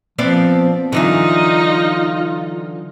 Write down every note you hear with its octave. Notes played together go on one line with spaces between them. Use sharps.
F3 B3 C4 D5
D3 E3 F#3 D#4 F4